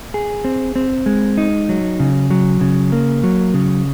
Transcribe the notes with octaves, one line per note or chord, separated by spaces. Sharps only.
G#4
C4
C4
G#3
D#4
F#3
C#3
F#3
C#3
A#3
F#3
C#3